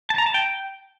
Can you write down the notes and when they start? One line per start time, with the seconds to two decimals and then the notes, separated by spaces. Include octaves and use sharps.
0.10 A5
0.18 A#5
0.26 A5
0.34 G5